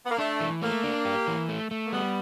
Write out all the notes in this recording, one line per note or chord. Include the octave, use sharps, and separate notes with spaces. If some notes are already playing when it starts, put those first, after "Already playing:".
B3
A#3
A3 D4
E3
A3 A#3
D4
G4
E3
A3
A3
A#3
G3 B3